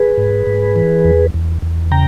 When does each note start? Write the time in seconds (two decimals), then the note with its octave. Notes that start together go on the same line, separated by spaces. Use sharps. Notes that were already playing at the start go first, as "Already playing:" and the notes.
Already playing: G#4 B4
0.18 G#2
0.47 G#2
0.76 E3
1.05 E2
1.34 E2
1.62 E2
1.91 C#3 G5 A#5